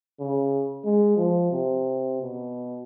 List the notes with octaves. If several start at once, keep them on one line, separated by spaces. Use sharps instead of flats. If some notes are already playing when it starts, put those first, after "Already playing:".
C#3
G#3
F3
C3
B2